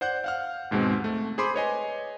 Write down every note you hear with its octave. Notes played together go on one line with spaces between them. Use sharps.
C5 D5 F#5 F#6 G6
F5 F#5 F6
D#2 G#2 B2 G#3 C4
A3
G#4 C5 B5 C6 D6
B4 C#5 D#5 G#5